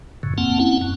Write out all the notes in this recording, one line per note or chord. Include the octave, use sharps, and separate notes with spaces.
F#2 A2 C#3
F2 A#3 C4 F#5 A5
C4 C#4 E4 F#5
F#2